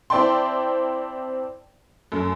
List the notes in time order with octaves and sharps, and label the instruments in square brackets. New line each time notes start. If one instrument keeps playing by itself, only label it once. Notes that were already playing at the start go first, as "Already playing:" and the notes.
[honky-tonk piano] C4 E4 D5 G5 A5 C6
F#2 A3